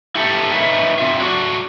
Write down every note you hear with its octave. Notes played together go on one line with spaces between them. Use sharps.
E4 G4 A4
D#4 A#4 B4 C#5 D#5 E5
C4 F4 E5
F#3 D4 F#4